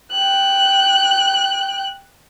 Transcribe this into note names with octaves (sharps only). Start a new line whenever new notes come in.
G5 F#6